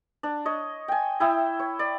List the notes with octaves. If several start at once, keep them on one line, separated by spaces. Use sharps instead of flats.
D4
C#5 D#5
G5 G#5
E4 E5 G5 D#6
C#5
D5